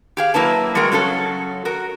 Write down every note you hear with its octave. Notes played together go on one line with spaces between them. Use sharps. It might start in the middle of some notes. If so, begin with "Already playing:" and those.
G4 G#4 F5
F#3 A#3 E4 B4 A5
G3 G#3 F#4 A#4
C#3 F#3 C#4 A4
F#4 A#4